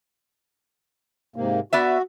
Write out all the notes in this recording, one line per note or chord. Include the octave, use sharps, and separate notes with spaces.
G#2 C3 A#3
B3 F#4 D5 E5